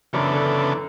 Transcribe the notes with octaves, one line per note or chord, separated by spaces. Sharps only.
F#2 C#3 E3 B3 D4 A4
D3